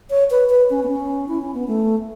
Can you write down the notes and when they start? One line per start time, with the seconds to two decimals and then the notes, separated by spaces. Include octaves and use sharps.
0.10 C#5
0.30 B4
0.50 B4
0.70 C#4
0.83 B3
0.89 C#4
1.28 E4
1.42 C#4
1.54 B3
1.68 A3